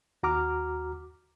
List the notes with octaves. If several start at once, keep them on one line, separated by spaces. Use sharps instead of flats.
D#2 F#4 A#5 D6 F6